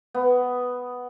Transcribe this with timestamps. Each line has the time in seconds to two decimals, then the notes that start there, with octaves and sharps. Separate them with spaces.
0.14 B3